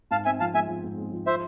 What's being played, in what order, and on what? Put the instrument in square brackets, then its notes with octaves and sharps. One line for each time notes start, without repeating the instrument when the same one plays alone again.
[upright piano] G#2 [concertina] F5 A5
[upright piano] C4 [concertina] E5 G#5
[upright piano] F3 [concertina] F5 A5
[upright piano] G#3 [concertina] E5 G#5
[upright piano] F3
G#2
G#3
F3
[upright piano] F4 [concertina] C5 E5